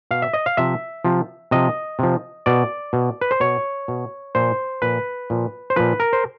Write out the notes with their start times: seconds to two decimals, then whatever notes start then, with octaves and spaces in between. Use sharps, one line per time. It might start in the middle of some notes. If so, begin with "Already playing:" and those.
0.11 B2 F5
0.22 E5
0.34 D#5
0.46 F5
0.57 C3 F3 E5
1.05 C3 F3
1.51 C3 F3 D#5
1.99 C3 F3
2.46 B2 D5
2.93 B2
3.21 B4
3.31 C5
3.40 B2 C#5
3.88 B2
4.35 A#2 F3 C5
4.82 A#2 F3 B4
5.30 A#2 F3
5.70 C5
5.76 A#2 F3 B4
6.00 A#4
6.13 C5